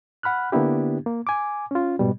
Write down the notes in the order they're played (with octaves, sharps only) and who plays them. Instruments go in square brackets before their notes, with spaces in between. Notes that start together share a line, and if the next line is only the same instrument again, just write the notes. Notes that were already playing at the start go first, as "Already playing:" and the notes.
[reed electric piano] F#5 B5 F6 F#6
D3 A#3 B3 D4 E4 G4
A#3
G#5 D6
C#4 F4
G#2 B2 G3